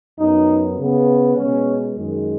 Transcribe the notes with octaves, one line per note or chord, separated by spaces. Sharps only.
F#2 F#3 B3 D#4
C#3 B3
B2 G#3 B3 C#4
F#2 D#3 G#3